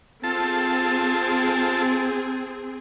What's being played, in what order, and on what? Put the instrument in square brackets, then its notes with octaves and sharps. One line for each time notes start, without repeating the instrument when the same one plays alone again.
[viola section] C4 G#4 [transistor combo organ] F4 A4 A5